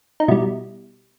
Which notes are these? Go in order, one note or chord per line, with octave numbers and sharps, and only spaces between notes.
D#4
B2 G3 E4